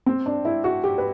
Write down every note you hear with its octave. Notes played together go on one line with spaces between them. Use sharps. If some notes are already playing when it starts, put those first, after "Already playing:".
C4
D4
E4
F#4
G4
B4